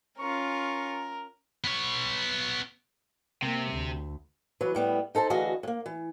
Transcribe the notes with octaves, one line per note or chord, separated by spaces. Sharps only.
C#4 F4 A#4 C#6
B3 C#5
C3 A#3
D2
E3 F#3 B4
A2 G3 B3
D#4 A4 C5 A5
D2 E3 F#4 G#4 D#5 F5
A2 A#3
E3